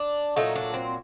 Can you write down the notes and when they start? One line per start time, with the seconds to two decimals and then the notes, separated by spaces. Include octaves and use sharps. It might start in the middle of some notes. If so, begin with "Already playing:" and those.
Already playing: D4
0.36 A#2 F#3 A3 D#4
0.55 D4
0.74 C4